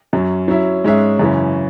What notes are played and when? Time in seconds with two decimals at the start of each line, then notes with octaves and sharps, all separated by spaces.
0.13 F#2 F#3 C#4
0.48 F#3 C#4 E4
0.84 G#2 G#3 C#4 G#4 E5
1.19 F#2 C#3 E3 C#4